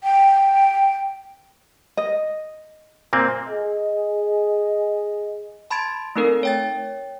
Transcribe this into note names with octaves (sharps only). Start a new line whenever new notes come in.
G5
D#5
A#2 A#3 C4
G#4 D#5
A5 B5 C6 G#6 A6 D7
A3 C4 D#4 A4 A#4
C#5 G5 A6